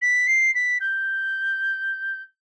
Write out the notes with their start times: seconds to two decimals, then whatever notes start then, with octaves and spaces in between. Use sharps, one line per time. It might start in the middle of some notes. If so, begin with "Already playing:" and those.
0.02 B6
0.27 C7
0.55 B6
0.81 G6